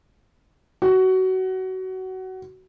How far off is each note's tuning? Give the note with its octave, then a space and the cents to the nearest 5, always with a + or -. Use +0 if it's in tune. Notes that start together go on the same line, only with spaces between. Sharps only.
F#4 +20